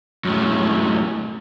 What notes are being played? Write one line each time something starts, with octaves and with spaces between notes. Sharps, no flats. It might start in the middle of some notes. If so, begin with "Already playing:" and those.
F#2 A2